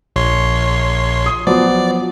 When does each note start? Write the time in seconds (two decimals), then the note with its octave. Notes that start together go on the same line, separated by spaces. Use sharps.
0.16 A#1 C#5 C6
1.26 D#6
1.47 F3 F#3 B3 D5